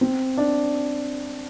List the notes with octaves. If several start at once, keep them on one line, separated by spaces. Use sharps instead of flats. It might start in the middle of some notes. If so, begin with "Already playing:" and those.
C4
D4